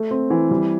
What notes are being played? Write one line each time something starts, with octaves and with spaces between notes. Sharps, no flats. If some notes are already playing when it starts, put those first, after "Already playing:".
Already playing: A3
C4
E3
G3